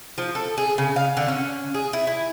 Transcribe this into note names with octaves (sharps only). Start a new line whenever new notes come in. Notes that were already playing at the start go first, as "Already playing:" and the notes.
F3
A4
G#4
C#3
F5
D3
C#4
G#4
E4
E4